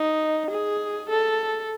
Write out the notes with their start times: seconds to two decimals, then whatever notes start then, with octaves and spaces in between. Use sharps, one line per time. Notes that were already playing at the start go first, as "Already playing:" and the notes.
Already playing: D#4
0.50 G#4
1.10 A4